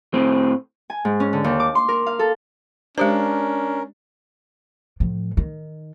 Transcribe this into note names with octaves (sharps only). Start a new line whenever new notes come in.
A2 C4
G#5
G#2
C#4
D3
D#2
D6
C6
A#4
F5
A4
G#3 C#4 D4 G4 A#4 C5
A2 F3
D#3